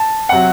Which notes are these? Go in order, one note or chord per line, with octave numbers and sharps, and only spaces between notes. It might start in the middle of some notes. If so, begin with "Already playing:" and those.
Already playing: A5
C3 F#3 F#5